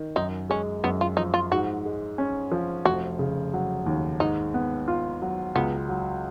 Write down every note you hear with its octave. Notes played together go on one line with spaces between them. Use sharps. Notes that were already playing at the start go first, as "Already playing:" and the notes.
Already playing: D#3
F#2 D#4
G#3 C#4
F#2 B3
F4
F3 D#4
F4
G#2 F#4
G#3
C#4
F3
F1 F#4
C#3
F#3
D#2
G#2 D#4
B3
F4
F#3
C#2 B3
F#3